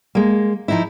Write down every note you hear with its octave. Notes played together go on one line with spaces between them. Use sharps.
G#3 A#3
F3 D#4 E4